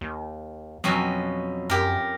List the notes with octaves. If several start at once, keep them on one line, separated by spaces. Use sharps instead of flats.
D#2
F2 B2 F#3 C#4
F#2 G4 A#4